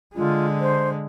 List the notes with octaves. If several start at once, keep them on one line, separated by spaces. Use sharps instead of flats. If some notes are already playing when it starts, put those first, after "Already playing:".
D3 G#3 F4
C5